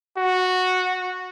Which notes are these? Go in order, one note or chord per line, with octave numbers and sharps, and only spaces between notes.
F#4